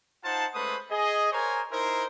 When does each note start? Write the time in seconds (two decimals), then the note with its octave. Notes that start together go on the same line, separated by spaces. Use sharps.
0.24 D#4 F4 C5 F#5 A5
0.54 G#3 A3 C#4 B4 C5 D#6
0.90 G#4 D#5
1.32 A#4 C5 C#5 G#5 A#5
1.71 D#4 E4 A#4 C5